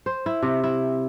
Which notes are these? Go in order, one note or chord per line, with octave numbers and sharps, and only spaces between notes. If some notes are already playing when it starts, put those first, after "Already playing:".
C5
E4
C3
E4